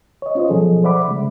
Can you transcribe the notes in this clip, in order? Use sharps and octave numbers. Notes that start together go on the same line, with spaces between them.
C#5 D#5
C#4 F4 C5 D#5
B2 F3 F#3 G#4 A4
C5 D5 E5 F#5 B5 D6
C#3 G#3